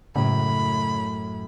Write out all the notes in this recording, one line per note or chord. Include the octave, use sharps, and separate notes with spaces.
F#2 A2 C#3 B5